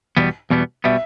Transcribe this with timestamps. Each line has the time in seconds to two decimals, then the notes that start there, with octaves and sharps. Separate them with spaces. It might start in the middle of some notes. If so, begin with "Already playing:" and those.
0.17 E2 B2 G3 B3
0.50 E2 B2 G3 B3
0.84 B2 G3 B3 E5